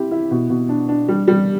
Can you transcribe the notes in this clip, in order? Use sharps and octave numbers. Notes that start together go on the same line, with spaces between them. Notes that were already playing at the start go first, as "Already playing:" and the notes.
Already playing: C4 E4 G4
E4
B2
B2
D4
D4
G3
G3